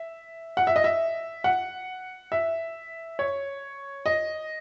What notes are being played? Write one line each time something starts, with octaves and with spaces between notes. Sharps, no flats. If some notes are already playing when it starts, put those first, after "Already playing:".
Already playing: E5
F#5
E5
D#5
E5
F#5
E5
C#5
D#5